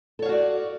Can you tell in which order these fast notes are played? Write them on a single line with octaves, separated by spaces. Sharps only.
A4 C#5 F5 F#4 D5